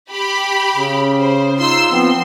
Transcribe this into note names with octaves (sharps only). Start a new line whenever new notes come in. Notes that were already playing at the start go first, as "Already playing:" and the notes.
G4 B5
C#3
C5
D#4 F4 C6 E6
F3 B3 C4 C6